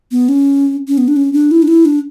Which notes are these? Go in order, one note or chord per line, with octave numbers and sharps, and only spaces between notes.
B3
C#4
C#4
B3
D4
C#4
D4
E4
D4
E4
D4